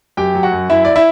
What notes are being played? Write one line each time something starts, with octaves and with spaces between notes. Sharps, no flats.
F#2 G4 G5
F#3
F#4 F#5
F#2
F#2 E4 E5
D5
E4 E5